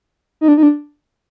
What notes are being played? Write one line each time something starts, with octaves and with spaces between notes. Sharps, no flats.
D#4
D4
D#4
D4